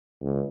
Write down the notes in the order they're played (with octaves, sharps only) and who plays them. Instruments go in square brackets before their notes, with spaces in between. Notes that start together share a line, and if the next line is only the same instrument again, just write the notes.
[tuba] C#2